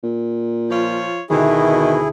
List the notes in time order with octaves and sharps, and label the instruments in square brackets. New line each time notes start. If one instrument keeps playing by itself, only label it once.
[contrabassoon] A#2
[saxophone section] F3 F4 C#5
[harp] D2 G4 [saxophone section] B2 [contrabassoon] D#3 [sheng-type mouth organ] E4 G#4